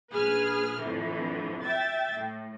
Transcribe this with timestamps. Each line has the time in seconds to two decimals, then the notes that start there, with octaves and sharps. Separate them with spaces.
0.12 A#1 G#4 B4 F6
0.79 F2 A2 D3 E3
1.64 E5 G5 A6
2.14 A2